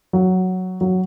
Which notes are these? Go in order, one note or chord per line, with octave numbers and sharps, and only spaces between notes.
F#3
F#3